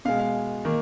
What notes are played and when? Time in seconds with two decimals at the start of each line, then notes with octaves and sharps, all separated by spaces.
0.05 B2 G#3 F5
0.19 F5
0.65 D#3 A#3